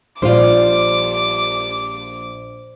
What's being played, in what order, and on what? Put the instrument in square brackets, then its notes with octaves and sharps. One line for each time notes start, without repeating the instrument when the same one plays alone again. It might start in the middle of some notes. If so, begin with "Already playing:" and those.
[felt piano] A#1 [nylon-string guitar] G3 F4 [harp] C5 D5 [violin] D6